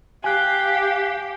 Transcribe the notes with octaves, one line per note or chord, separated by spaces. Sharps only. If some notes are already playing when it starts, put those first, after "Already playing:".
G4 F5 G#5 F#6